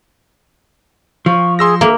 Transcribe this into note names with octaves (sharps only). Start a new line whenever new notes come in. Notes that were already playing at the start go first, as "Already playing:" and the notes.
F3 C#6
G#4 C6 E6 A#6
A#3 E5